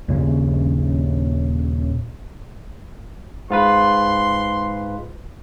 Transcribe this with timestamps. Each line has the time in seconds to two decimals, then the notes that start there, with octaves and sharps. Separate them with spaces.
0.09 D#1 C#3
3.50 G#2 F4 B4 C6